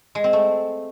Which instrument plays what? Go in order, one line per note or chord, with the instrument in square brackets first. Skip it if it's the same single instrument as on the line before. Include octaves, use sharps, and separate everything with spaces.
[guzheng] G#3
C4
A3